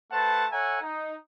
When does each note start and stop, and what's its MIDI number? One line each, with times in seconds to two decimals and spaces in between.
0.12 0.46 57
0.12 0.46 71
0.12 0.46 72
0.12 0.46 78
0.12 0.46 81
0.52 0.79 69
0.52 0.79 73
0.52 0.79 76
0.52 0.79 78
0.52 0.79 80
0.52 0.79 82
0.82 1.14 63